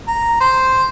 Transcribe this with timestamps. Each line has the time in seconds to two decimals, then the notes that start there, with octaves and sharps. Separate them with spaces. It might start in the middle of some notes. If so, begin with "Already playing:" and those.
0.08 A#5
0.40 C5